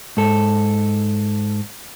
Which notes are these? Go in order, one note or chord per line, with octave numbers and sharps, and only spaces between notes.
G#2 A4